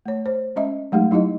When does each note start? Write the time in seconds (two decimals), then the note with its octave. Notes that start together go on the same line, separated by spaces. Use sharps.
0.06 A3 C#5
0.26 C5
0.56 G#3 C#4 D#5 E5
0.92 F#3 G#3 A3 D#4 G4 F5
1.11 F#3 D#4 E4 G4 D#5